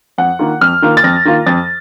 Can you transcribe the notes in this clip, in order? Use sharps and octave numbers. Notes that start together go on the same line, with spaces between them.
F2 F#5
D#3 A#3 F4
F2 F6
D#3 A#3 F4
A6
F2 A#6
D#3 A#3 F4
F2 A6